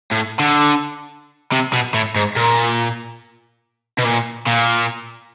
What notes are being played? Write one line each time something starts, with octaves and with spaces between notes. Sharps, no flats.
A2
D3
C3
B2
A2
G#2
A#2
B2
A#2
A#2